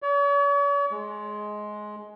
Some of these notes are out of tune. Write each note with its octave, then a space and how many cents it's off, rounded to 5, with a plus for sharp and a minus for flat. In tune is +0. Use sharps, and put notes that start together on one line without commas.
C#5 +45
G#3 +15